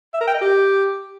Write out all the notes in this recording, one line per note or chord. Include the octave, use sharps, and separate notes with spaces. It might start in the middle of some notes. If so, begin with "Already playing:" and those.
E5
A#4
G5
D#5
G4